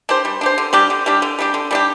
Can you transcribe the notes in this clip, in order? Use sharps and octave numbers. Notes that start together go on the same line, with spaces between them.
D4 G4 C5
G3
D4 G4 C5
D3
G3 D4 G4
D3
G3 D4 G4
D3
G3 D4 G4
D3
G3 D4 G4